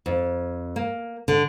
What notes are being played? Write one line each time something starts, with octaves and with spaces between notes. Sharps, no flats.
F2
A#3
D3